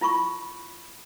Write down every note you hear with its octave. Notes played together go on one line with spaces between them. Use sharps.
E4 F4 B5 C#6